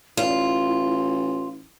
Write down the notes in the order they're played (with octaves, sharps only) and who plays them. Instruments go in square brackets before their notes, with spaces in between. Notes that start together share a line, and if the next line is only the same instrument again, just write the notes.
[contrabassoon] A1 [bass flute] E4 [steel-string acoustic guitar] F4